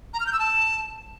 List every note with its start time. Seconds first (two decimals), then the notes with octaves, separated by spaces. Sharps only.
0.14 A#5
0.20 F6
0.26 G6
0.33 E6
0.39 A5